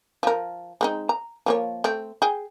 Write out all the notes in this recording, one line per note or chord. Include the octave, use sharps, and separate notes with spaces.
F3 A#4
G#3 C4 D#4
A#5
F3 A#3 C#5
A3 C4
G#4 G5